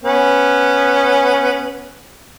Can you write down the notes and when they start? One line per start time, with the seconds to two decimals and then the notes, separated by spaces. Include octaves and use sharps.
0.03 B3 C#4